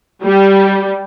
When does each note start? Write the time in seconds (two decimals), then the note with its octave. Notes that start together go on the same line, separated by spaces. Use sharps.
0.22 G3